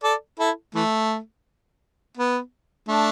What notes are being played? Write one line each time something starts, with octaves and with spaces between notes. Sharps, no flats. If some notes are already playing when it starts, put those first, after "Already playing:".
A4 D5
E4 A4
E3 A3
B3
A3 D4